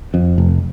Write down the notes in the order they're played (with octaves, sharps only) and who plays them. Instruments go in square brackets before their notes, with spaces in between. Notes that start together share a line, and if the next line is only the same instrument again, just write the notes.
[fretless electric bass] F2
F1